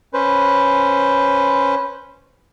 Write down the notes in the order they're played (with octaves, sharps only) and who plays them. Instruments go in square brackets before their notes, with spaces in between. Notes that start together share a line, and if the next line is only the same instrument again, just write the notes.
[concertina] C#4 B4 C5